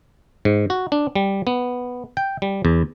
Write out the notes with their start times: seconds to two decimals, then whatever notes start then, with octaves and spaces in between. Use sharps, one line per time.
0.45 G#2
0.70 F#4
0.92 D4
1.15 G3
1.47 B3
2.17 G5
2.42 G3
2.65 E2